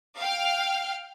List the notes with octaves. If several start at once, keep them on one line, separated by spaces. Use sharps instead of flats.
F5 G5 F6